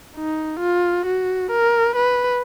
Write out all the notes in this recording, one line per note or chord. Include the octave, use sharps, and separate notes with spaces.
D#4
F4
F#4
A#4
B4